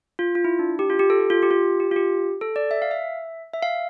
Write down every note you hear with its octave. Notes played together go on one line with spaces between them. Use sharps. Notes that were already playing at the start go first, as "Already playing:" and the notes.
F4
F4
E4
D4
G4
F4
G4
A4
G4
F4
G4
F4
G4
F4
G4
A4
D5
E5
F5
E5
E5
F5